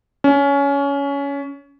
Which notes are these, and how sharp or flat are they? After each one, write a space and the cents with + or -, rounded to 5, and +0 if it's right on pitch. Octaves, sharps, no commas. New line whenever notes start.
C#4 +20